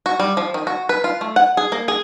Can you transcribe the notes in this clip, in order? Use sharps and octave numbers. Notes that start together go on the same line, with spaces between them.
F#4
G3
F3
D#3
F#4
B4
F4
A3
F#5
G#4
A#3
G#4